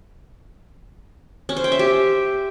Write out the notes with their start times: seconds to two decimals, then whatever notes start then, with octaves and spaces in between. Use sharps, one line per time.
1.49 C#4
1.57 C5
1.64 G5
1.72 E5
1.79 G4